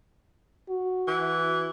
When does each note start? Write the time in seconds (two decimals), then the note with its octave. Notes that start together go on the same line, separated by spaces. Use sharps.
0.69 F#4
1.08 E3